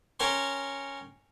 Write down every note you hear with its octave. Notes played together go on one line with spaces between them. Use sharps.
C#4 A#4 C#5 G5 C6